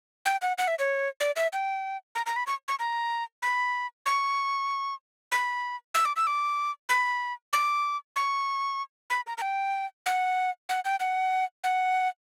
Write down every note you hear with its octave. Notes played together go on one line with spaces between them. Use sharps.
G5
F#5
F#5
E5
C#5
D5
E5
G5
A#5
A#5
B5
C#6
C#6
A#5
B5
C#6
B5
E6
D6
E6
D6
B5
D6
C#6
B5
A#5
A#5
G5
F#5
F#5
G5
F#5
F#5